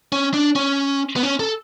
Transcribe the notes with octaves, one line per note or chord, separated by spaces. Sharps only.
C#4
D4
C#4
B3
C#4
A4